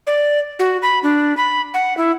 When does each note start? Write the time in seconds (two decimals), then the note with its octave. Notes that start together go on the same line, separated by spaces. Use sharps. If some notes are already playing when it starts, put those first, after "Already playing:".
0.07 D5
0.59 F#4
0.82 B5
1.03 D4
1.37 B5
1.74 F#5
1.97 E4